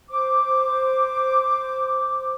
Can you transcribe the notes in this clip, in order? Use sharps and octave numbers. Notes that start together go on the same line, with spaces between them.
C5 D6